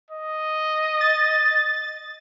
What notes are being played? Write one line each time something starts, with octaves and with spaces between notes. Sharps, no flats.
D#5
A6